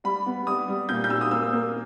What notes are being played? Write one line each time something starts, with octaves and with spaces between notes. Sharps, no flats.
G3 B5
B3
G3 D#6
G3
A#2 G6
G6
A#2 E6
D#6
A#3 E6
A#3